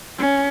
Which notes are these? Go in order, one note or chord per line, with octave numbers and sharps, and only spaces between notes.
C#4